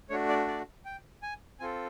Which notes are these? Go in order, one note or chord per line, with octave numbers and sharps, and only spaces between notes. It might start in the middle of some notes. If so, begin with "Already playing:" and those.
A3 D4 F#4 C#5
D5
D5
G5
G#5
C4 F4 A4 G#5